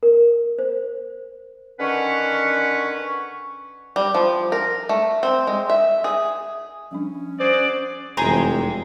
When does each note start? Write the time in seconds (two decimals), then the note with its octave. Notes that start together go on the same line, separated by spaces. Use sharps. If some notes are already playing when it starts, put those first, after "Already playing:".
0.03 A#4
0.59 C5
1.80 D3 D#3 C#4 B4 F#5 C#6
3.96 G3
4.15 F3
4.52 A#4
4.89 A3
5.23 C4
5.47 G#3
5.70 E5
6.04 G#4
6.91 F3 G3 C#4 D4
7.40 F#4 G#4 C5 D5
8.17 F1 F#2 E3 G#3 G#4 C5 G5 A#5